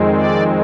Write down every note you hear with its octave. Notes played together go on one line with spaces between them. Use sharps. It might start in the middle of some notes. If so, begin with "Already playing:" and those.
Already playing: F2 D#3 G#3 C4
D5